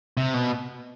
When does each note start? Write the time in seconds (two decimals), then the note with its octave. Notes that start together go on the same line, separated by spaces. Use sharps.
0.17 C3
0.34 B2